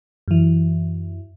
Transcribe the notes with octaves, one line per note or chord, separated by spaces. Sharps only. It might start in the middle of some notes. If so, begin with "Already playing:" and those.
F#2 E3